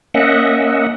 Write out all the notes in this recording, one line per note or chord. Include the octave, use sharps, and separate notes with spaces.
A#3 C#4 D#5 E5 F#5